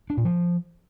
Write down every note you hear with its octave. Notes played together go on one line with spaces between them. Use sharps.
D4
A#2
F3